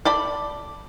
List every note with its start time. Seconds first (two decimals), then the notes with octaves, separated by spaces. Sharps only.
0.05 A4 D5 B5